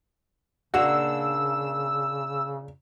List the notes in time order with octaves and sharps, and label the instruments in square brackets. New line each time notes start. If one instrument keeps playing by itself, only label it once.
[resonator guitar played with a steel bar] A#2 A#3 D4 [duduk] C#3 [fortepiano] F#4 [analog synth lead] E6